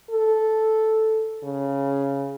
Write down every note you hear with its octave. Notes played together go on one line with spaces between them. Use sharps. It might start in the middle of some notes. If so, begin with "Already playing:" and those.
A4
C#3